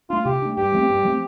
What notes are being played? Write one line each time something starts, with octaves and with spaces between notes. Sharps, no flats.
A3 D4 F4
C3 G4
A3 D4
G2 G4
F3 A3 C4
G2
F3 A3 C4